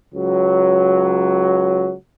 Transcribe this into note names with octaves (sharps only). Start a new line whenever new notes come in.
C#2 F#3